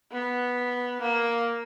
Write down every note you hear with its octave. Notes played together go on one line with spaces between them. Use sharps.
B3
A#3